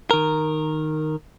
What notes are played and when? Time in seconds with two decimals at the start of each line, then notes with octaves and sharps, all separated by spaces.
0.11 D#3 A#4